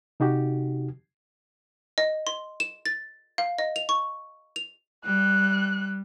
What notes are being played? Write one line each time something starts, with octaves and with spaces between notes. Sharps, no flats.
C3 D#4 F#4 G4
D#5
C6
E7
A6
F5
D#5
F7
C#6
F7
G3 F#6